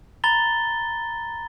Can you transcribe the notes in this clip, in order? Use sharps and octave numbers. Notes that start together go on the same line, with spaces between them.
A#5 B5 A6 G7